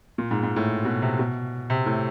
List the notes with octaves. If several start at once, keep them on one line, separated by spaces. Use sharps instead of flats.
A#2
G#2
G#2
A2
B2
C3
B2
C3
A2